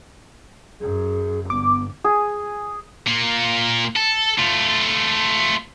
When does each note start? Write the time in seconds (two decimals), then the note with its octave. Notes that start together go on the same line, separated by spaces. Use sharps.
0.81 F#2 G#4
1.50 G1 B3 D6
2.04 G#4
3.07 A#2 A#3
3.96 A4
4.38 A3 F4